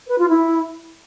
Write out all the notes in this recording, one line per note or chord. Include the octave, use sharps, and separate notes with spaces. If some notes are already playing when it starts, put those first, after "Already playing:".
B4
F4
E4